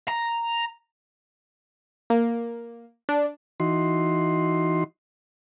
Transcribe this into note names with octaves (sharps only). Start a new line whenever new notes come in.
A#5
A#3
D4
E3 D#4 F#4 C6